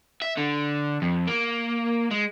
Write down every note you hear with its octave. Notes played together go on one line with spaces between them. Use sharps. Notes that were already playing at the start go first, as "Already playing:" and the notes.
E5
D3
F2
A#3
G#3